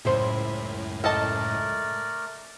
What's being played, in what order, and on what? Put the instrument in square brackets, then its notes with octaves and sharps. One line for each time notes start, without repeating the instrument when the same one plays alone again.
[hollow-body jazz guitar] C#2 C5 [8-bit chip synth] F#2 A2 [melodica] E5 B5
[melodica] A3 A#4 D5 [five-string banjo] A4 D#5 A5